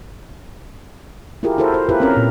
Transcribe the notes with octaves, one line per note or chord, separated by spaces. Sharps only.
E4 F4 G4 G#4 A#4
E4 F#4 A4 A#4 C5
C5
E4 F4 G4 A#4 B4
C4 C#4 A#4
A#2